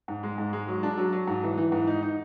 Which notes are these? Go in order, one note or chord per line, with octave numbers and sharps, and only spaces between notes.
G#2
G#3
G#2
G#3
F#3
D4
F#3
F#3
G#2
E3
E3
G#2
D#4
D#4